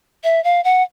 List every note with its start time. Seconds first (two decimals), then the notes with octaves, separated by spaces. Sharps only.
0.24 E5
0.44 F5
0.64 F#5